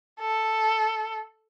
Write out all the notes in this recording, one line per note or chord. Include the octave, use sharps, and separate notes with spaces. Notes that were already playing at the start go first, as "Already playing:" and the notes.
A4